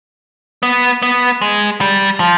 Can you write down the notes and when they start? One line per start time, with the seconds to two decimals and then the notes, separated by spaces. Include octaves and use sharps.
0.63 B3
1.02 B3
1.42 G#3
1.81 G3
2.20 F3